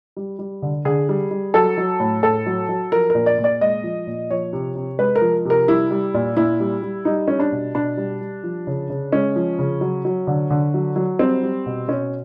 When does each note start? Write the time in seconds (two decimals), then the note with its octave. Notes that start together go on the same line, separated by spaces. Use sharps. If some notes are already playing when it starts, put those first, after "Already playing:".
0.17 G3
0.39 G3
0.62 D3
0.85 D3 G#4
1.09 G3
1.31 G3
1.54 F#3 A4
1.78 F#3
2.00 A2
2.23 A2 A4
2.46 F#3
2.69 F#3
2.92 F3 A#4
3.10 A#2 A#4
3.26 D5
3.38 A#2
3.44 D5
3.61 G#3 D#5
3.83 F3
4.07 A#2
4.31 F3 C#5
4.53 C3
4.76 C3
4.99 G#3 B4
5.16 A#4
5.21 F3
5.45 C3 A#4
5.68 G3 E4
5.91 G3
6.14 A#2
6.36 A#2 E4
6.60 G3
6.83 G3
7.05 G3 D#4
7.28 G3 C#4
7.40 D4
7.52 B2
7.75 B2 D4
7.97 G3
8.21 G3
8.43 F3
8.67 C#3
8.90 C#3
9.12 G#3 C#4
9.36 F3
9.59 C#3
9.81 F#3
10.05 F#3
10.27 D3
10.50 D3
10.74 F#3
10.96 F#3
11.19 G3 C4
11.43 G3
11.66 B2
11.88 B2 C#4